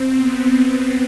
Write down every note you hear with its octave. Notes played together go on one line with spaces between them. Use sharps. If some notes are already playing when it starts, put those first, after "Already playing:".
Already playing: C4
B3